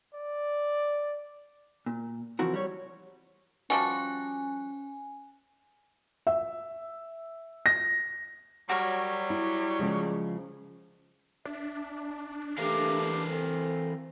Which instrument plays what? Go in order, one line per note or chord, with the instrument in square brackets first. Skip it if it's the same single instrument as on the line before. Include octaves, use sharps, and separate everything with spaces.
[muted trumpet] D5
[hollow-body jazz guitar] A#2
C#3 E3 F3 C4 F#4 A#4
G3 C#5
[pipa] F3 G3 F#4 [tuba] C#4 [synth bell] G#5
[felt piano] E5
A#6
[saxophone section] F#3 G3 [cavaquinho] F#4 A#4 C#5
[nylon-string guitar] E4
C#3 F3 G#3
[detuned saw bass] D4 [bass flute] E5
[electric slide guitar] E3 A#4 F5 [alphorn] A3 [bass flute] G4
[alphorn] C4 [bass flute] A4